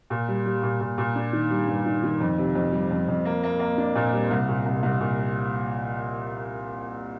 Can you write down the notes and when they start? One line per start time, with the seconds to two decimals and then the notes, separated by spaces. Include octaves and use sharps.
0.10 A#2
0.28 G3
0.46 G3
0.63 A#2
0.80 A#2
0.98 A#2
1.16 D4
1.33 D#3
1.51 G3
1.67 G2
1.86 D#3
2.04 D#3
2.21 F2
2.38 C3
2.55 F2
2.73 G3
2.91 F2
3.09 F2
3.25 A#3
3.43 A#3
3.60 A#3
3.78 D4
3.95 A#2
4.13 G3
4.31 C2
4.48 A#2
4.66 C2
4.83 C2
5.00 A#2